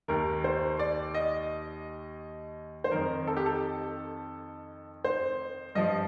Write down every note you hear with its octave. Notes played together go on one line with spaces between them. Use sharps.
D#2 D#3 A#4
C5
D5
D#5
C5
F2 D#3 A#4
A4
G4
A4
C5
G2 F3 D#5